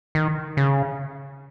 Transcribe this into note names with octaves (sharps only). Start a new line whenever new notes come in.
D#3
C#3